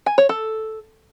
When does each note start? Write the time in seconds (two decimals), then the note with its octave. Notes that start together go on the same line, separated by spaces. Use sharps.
0.06 G#5
0.18 C#5
0.29 A4